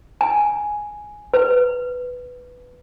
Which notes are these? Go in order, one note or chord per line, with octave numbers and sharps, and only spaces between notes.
G#5
B4